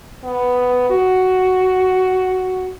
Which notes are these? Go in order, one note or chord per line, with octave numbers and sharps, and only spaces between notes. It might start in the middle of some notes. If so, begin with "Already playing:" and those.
B3
F#4